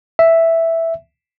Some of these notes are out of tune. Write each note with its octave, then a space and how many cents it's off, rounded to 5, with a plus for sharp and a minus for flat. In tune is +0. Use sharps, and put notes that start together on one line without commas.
E5 +0